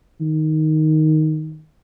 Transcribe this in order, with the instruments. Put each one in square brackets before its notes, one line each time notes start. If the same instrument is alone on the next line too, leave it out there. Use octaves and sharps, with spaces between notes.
[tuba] D#3